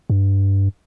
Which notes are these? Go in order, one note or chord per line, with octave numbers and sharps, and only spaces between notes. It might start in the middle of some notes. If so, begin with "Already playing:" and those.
G2